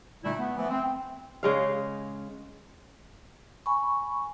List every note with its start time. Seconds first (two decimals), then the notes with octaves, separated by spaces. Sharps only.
0.24 A#2 D3 G3 A3 D#4 E4
0.39 B3
0.56 E3 F3 A3 B3
0.70 C4
1.43 C#3 G#3 F5
3.66 G#5 B5 C#6